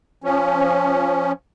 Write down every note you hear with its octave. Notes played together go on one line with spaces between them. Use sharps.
F3 C#4